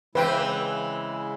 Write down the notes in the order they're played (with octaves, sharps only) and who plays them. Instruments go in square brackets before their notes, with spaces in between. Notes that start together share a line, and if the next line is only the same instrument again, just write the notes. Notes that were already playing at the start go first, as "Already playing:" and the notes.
[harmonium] C#3 G#3 E4 [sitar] E3 C4 [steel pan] B4 G5